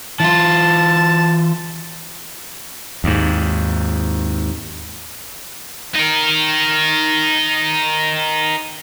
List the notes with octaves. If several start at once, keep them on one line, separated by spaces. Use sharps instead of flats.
E3 F4 A5
D#2 G#2
D#4 A#4